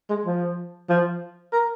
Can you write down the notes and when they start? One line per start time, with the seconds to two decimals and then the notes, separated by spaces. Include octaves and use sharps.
0.10 G#3
0.26 F3
0.89 F3
1.53 A#4